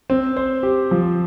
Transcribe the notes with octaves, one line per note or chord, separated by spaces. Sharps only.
C4
C5
G4
F3